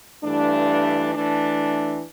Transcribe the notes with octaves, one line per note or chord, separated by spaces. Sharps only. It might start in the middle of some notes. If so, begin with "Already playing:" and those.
G2 E3 A3 D4
E3 A3 D4